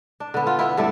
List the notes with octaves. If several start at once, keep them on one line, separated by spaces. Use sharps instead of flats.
D4
D3 B3
F4
B3 E4
G2 A3 E4 D5